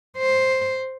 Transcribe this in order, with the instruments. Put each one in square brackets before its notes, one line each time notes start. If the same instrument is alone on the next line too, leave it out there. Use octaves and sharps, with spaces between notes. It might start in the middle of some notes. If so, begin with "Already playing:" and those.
[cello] C5